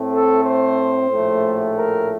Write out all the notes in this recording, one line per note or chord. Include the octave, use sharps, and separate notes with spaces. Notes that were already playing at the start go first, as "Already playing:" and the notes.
Already playing: A2 A3 C4
A4
C5
A#1 A2 A3
A#4